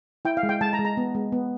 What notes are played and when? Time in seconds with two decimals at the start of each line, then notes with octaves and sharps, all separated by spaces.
0.25 E4 G5
0.37 F5
0.43 G#3
0.49 G5
0.61 G#3 A5
0.73 A#5
0.79 G#3
0.85 A#5
0.97 B3
1.15 G#3
1.32 B3